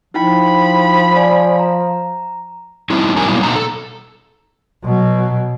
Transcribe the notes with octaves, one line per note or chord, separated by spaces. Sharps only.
F3 D#4 E4 G5 B5
D5 G#5
A#5
G3 C4 D#4 E4
F2 D3 G3 G4 A#4 G#5
B2 F#3 G3 A#3 B3 E4
B2 D3 D#4 A#5
A4
B2 F#3